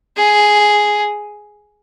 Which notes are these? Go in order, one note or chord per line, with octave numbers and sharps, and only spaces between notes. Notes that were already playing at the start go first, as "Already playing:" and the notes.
G#4